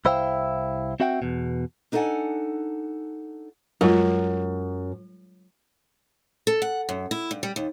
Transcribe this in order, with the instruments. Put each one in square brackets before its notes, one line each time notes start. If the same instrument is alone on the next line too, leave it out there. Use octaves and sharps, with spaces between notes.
[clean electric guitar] C2 E4 C5 E5 F5 G5
C4 F#4 E5 F#5 G5
E2 B2
[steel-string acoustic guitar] D4 D#4 A4 D#5 F#5 G#5
[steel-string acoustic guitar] F#2 [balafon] F#3 G#3 F4
[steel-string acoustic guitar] A4
F#5
F#2
E4
G2
G3
D#2